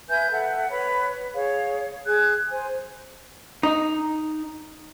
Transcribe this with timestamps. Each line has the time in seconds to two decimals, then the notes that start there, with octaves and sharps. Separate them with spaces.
0.10 B4 E5 G#5 G6
0.32 A4 E5 F#5
0.69 B4 C#5 B5
1.34 G#4 C#5 F5
2.06 G#4 F#6 G#6
2.50 C5 G#5
3.63 D#4